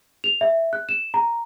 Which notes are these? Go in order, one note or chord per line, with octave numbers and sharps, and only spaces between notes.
F7
E5
F#6
E7
A#5